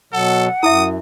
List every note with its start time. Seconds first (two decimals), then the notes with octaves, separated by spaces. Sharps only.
0.13 B2 F#3 A4 F#5
0.63 F#2 E4 E5 D#6